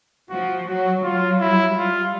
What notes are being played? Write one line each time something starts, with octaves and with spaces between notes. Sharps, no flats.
F3 F#4
F#3 F#4
F#3 F4
E4
G3 F4